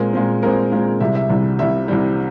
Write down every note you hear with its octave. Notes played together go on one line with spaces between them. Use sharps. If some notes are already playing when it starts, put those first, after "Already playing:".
Already playing: A#2 G#3 C4 A#4
A#2 G#3 C4
A#2 G#3 C4 A#4
A#2 G#3 C4
C2 C3 G3 E5
E5
C2 C3 G3
C2 C3 G3 E5
C2 C3 G3